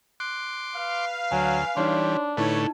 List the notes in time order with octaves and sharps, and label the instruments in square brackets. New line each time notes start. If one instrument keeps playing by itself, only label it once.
[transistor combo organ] C6 D6 [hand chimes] F#6
[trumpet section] B4 F5
[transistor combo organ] D2 [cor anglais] F#3 [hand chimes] G#5
[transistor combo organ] E3 G3 [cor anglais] D4 [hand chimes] D#4 C#5 C6
[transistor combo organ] A2 D3 A3 [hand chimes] D#4 E4 A5 [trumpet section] B4 C#5